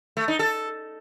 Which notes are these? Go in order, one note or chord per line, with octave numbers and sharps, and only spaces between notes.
A3
D#4
A4